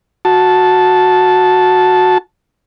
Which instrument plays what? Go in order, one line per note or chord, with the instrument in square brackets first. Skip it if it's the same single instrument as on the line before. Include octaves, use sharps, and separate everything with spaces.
[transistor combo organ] F#4 A5